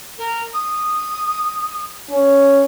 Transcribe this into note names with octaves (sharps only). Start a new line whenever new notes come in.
A#4
D#6
C#4